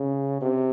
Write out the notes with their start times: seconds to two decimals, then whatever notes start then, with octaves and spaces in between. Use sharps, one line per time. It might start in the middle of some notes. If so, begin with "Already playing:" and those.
Already playing: C#3
0.41 C3